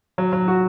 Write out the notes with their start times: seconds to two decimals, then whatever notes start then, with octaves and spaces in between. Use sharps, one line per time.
0.18 F#3
0.33 F#3
0.48 F#4